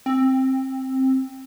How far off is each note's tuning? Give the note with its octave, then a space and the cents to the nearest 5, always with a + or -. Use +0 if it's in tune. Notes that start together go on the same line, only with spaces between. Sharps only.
C4 +15